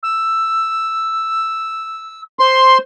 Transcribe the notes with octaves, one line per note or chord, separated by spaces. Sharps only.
E6
C5 C6